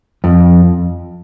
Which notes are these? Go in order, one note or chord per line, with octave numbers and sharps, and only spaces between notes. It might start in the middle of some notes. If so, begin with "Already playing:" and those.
F2